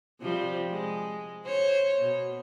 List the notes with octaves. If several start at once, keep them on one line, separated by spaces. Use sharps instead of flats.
C3 F3 G3
G#3
C5 C#5
B2